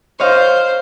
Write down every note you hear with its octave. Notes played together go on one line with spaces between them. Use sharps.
C5 C#5 D#5 F5